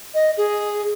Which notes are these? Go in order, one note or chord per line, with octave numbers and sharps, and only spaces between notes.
D#5
G#4